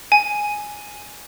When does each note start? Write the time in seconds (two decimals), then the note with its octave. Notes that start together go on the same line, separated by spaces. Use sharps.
0.12 G#5